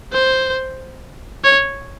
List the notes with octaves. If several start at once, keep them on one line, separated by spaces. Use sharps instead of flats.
C5
C#5